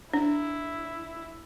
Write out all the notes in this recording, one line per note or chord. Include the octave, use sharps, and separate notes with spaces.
D4 E4